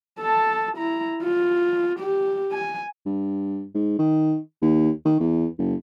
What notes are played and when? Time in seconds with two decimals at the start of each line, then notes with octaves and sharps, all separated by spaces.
0.19 A4 A5
0.78 E4 A#5
1.23 F4
2.00 G4
2.52 G#5
3.06 G2
3.74 G#2
3.99 D#3
4.62 D#2
5.05 D#3
5.20 E2
5.58 F#1